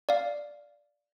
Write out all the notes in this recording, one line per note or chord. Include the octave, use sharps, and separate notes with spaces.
D5 F5